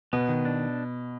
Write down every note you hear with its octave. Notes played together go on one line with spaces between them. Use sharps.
B2 B3
D#3
D4